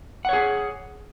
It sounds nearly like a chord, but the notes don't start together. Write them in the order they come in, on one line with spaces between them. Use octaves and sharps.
F#5 C#5 G#4